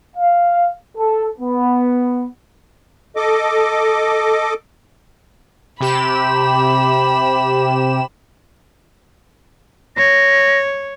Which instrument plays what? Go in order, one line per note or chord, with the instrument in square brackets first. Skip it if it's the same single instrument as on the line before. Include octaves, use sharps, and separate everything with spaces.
[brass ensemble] F5
A4
B3
[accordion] A4 D#5 D6
[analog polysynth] C3 G4 E7 [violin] B5
[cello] C#5 [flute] A#6